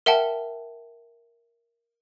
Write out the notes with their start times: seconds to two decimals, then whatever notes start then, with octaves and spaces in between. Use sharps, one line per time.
0.06 A#4 E5 F#5 G5 A5